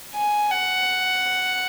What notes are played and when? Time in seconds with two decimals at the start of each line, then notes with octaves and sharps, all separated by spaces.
0.14 G#5
0.51 F#5